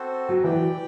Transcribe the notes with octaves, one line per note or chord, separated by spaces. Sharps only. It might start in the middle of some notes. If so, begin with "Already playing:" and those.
Already playing: C4 F#4 A4 C5
F#3
E3 G4 D5 G5